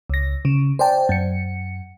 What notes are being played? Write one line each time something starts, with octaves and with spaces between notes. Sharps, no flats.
C#2 A#6
C#3
C5 D5 G5 A5
F#2 C#7